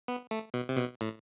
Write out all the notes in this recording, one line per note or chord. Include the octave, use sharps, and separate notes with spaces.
B3
A3
B2
C3
B2
A2